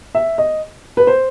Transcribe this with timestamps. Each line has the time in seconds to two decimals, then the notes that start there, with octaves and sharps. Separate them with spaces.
0.15 E5
0.38 D#5
0.97 B4
1.07 C5